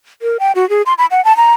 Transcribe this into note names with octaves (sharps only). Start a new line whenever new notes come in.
A#4
G5
F#4
G#4
C6
B5
F#5
A5
A#5